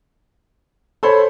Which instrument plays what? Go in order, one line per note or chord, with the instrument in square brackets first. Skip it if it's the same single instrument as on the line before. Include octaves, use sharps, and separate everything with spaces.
[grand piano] A4 C#5 [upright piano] C5 B5